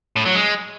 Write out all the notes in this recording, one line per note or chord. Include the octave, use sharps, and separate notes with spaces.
A2
F#3
G#3